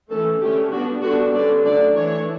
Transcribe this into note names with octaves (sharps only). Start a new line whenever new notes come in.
E3 A3 C#4 A4
D3 A3 C#4 G4
G3 B3 D4 F#4
D3 G3 B3 D4 F#4
D3 G3 C#4 D5
F#3 A3 D4 D5
E3 A3 D4 C#5